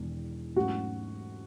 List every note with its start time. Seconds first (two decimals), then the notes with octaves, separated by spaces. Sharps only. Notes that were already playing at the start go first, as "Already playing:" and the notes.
Already playing: E1 E2 D#3
0.56 G#2 F#3 A3 C#4 F#4